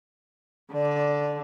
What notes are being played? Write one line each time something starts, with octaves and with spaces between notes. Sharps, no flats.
D3 D5